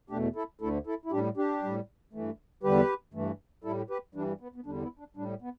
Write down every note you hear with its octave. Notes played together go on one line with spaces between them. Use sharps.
E2 B2 A3 D4 G4
E4 A4
D2 D3 A3 E4 A4
E4 A4
E4
A2 G3 D4 G4
D4 G4
A2 G3
G2 E3 A3
E2 D3 G3 G4 B4
G2 E3 A3
A2 G3 E4 A4
G4 B4
G2 E3 G3 D4
B3
B3
E2 D3 G3 D4
B3 E4
D4
A2 G3 D4
B3